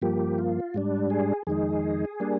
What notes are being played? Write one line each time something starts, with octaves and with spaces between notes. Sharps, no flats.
G2 F3 A#3 G4
F4
G#2 G3 D4
G#4
F2 D#3 G#3 D#4 G#4
G3 A#3 D4